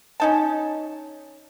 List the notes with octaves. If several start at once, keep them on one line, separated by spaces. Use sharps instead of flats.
C#4 D#4 A5